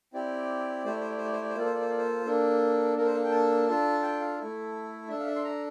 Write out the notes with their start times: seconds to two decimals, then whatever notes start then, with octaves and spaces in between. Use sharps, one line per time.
0.13 C4 E4 G4 D5
0.84 A3 E4 G4 C5
0.93 D5
1.00 C5
1.10 D5
1.18 C5
1.25 D5
1.33 C5
1.42 D5
1.49 C5
1.55 A#3 F4 A4 D5
1.65 C5
1.74 D5
1.81 C5
1.90 D5
1.98 C5
2.26 A#3 D4 A4
2.97 A#3 D4 A4 A#4
3.06 C5
3.15 F5
3.24 G5
3.32 A5
3.68 D4 F4 A4
4.02 G5
4.20 F5
4.38 A3 E4 A4
5.09 D4 A4 E5
5.19 F5
5.27 E5
5.36 C6
5.44 A#5